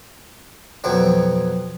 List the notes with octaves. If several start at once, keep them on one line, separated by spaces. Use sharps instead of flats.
F2 B2 F#3 C4